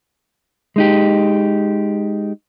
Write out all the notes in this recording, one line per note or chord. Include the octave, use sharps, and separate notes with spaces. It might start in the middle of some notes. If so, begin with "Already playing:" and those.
G#3 D#4 G4